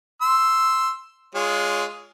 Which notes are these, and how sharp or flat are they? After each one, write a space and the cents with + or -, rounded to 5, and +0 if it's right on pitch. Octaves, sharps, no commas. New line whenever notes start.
C6 +0 E6 +0
G#3 +0 F4 +0 C#5 +30